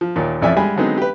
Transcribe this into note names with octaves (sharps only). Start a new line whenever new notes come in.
F3
D#2 A#2
A1 F2 D5 E5 G#5
G3 G#3 G#5 B5
D3 F#3 G#3 B3 C4 D#4
G4 B4